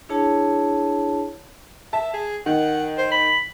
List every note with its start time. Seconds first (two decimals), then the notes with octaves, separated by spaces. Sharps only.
0.09 D4 E4 G#4 C#5 A5
1.93 E5 A5
2.14 G#4
2.46 D#3 F#5
2.98 C5
3.12 B5